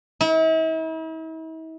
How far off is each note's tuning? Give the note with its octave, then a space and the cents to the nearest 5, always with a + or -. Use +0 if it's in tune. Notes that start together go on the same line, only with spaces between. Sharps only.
E4 -45